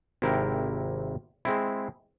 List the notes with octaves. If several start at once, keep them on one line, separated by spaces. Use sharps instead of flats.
G#1 C3 E4 A#4 G5
G#3 C4 E4